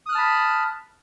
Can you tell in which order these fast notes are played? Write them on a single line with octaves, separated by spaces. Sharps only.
D#6 F#6 F6 A5 B5